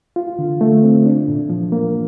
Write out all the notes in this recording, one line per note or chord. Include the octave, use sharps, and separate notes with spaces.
F4
D3
A3
C4
D4
A#2
F3
A#3